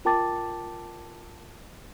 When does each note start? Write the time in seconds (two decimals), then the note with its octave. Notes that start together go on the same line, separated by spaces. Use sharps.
0.05 F4 A#4 G5 A5 D6 A6